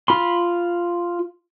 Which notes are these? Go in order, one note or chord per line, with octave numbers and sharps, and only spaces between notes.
F4 B5 C6